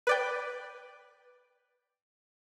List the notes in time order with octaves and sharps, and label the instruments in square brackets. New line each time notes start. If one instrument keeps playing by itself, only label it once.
[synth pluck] B4 D5 G5